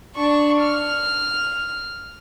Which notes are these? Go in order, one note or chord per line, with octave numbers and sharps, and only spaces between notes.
D4 C#6
F6